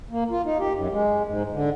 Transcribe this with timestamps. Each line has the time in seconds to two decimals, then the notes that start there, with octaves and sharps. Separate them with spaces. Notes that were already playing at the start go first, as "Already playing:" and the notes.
0.10 A#3
0.30 F4
0.45 D#4
0.59 G4
0.74 F#2
0.92 G#3
1.27 G#2
1.52 D3